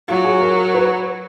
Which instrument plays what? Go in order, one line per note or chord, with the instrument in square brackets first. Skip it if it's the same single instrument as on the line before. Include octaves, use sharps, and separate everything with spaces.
[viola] F#3 [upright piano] F4
[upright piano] G#4
A#4
B4